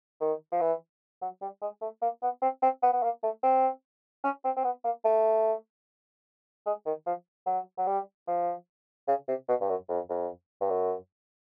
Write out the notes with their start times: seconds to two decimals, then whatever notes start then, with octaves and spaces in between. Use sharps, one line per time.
0.21 D#3
0.52 F3
0.61 E3
1.22 F#3
1.41 G3
1.61 G#3
1.81 A3
2.02 A#3
2.23 B3
2.42 C4
2.62 C4
2.82 B3
2.93 B3
3.03 A#3
3.23 A3
3.43 C4
4.24 C#4
4.44 C4
4.56 C4
4.64 B3
4.84 A#3
5.04 A3
6.66 G#3
6.86 D#3
7.06 F3
7.46 F#3
7.78 F#3
7.87 G3
8.28 F3
9.08 C#3
9.28 C3
9.48 B2
9.61 G2
9.69 F#2
9.89 F2
10.09 F2
10.61 G2
10.69 F#2